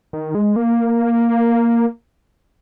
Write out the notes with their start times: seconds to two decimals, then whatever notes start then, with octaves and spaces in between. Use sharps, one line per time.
0.13 D#3
0.35 G#3
0.56 A#3